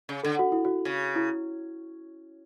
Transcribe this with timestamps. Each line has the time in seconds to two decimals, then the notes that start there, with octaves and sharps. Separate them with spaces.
0.09 C#3
0.23 D3 A4
0.39 F#4
0.52 E4
0.65 F#4
0.85 C#3
1.16 E4